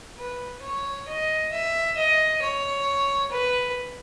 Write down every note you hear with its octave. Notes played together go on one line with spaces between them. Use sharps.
B4
C#5
D#5
E5
D#5
C#5
B4